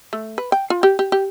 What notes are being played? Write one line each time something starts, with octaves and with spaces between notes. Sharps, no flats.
A3
B4
G5
F4
G4
G4
G4